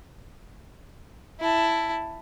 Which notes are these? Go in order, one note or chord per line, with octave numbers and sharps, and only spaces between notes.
E4 A5